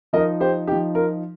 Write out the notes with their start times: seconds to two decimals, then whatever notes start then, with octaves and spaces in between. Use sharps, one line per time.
0.13 F3 D#4 A#4 D#5
0.40 G4 C5
0.67 F3 D#4 G4
0.95 F4 A#4